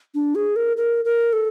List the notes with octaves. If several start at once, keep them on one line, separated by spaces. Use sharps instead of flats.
D4
G#4
A#4
A#4
A#4
A4